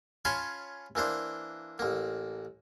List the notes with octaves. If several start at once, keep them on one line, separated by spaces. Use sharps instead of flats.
C#4 F4 C#5 A5 B5 C6
E3 A#3 D4 C5
A1 A#3